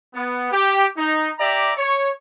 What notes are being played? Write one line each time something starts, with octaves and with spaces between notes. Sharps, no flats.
B3
G4
D#4
G4 D5 E5 A#5
C#5 C#6